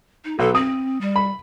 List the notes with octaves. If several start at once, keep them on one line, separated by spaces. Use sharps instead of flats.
D#4
B1 A4
C4 D#6
G3
B5